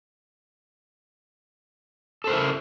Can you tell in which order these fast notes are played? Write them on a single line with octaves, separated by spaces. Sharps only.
A4 C5 A#4 E4